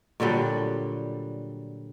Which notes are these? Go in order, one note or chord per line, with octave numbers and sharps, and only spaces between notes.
A#2 D3 F#3 G3